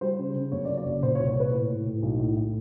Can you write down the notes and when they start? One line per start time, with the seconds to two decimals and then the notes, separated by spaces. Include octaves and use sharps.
0.01 G3 C5
0.19 C#3
0.35 C#3
0.52 F#2 C#5
0.65 D5
0.68 F#2
0.77 D5
0.85 F#1
1.02 A#2 C5
1.15 C#5
1.20 C2
1.27 C#5
1.35 A#2 B4
1.53 A2
1.69 A2
1.87 A2
2.02 B1
2.19 A2
2.37 A2